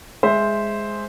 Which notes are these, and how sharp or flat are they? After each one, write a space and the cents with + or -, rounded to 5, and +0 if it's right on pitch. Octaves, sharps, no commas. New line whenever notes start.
G#3 +0 C5 +0 E5 +0